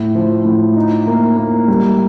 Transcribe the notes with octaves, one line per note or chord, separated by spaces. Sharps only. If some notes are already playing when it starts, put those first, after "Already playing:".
Already playing: A2
F3
A2
D#4
A#3
A#3
G3